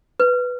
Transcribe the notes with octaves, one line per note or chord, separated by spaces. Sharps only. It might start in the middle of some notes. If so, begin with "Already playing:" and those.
B4